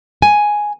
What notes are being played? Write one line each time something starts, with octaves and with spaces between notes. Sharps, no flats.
G#5